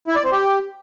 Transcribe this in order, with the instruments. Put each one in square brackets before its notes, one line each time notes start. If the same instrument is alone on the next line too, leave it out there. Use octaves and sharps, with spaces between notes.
[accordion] E4
D5
C4
G4